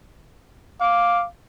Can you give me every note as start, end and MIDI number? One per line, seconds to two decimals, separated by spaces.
0.81 1.27 77
0.81 1.21 86